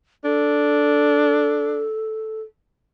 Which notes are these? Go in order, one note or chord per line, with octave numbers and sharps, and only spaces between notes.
D4 A4